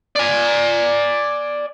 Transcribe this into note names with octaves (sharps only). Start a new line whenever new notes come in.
D5 G#5